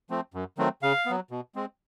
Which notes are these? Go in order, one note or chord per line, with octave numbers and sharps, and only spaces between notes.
F3 A3 C4
F#2
D#3 F#3 A3 C4
C#3 F5
F#3 B3
B2
G#3 C4